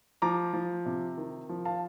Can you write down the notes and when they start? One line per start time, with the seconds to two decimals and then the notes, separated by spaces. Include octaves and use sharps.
0.22 F3 A#5 D6
0.53 F3
0.86 C3
1.17 D#3
1.49 F3
1.65 F5 A5